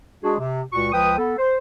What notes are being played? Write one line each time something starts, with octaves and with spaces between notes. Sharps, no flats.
G#3 D4 F#4 G#4
C3
C#2 A#2 F#4 C#6
C#2 F3 B4 G5 D#6
B3 A4
C5